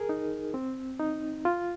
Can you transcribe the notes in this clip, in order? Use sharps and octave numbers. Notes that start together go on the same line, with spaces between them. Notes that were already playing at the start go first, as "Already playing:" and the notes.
Already playing: G#4 A#4
D#4
C4
D#4
F4